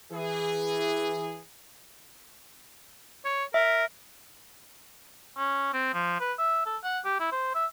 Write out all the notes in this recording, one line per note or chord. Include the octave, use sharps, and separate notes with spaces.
E3 G#4
C#5
A#4 E5
C#4
C4
F3
B4
E5
A4
F#5
G4
E4
C5
E5